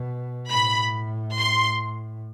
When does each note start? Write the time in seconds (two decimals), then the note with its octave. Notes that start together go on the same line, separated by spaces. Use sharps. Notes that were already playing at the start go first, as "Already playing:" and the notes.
Already playing: B2
0.50 A2 B5
1.38 C6